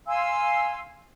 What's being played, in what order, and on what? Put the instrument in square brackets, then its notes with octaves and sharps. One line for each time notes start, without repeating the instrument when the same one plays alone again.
[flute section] F5 G#5 C6 E6